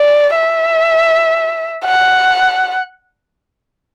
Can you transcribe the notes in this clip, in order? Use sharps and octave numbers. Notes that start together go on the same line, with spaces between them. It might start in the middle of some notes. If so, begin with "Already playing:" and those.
Already playing: D5
E5
F#5